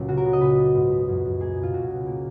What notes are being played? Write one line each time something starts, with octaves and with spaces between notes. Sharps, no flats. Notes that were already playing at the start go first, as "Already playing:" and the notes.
Already playing: C#2 A#2 F#3
C#3 F#4
A#4
B3
D#5
A#2 B4
B3
G#2
B3
F#2
F#2
A#3 G#4
B2
F4
C#2 F#4
B2
A#3